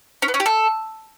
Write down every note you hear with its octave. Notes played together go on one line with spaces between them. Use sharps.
C#4
B3
C#4
G4
A4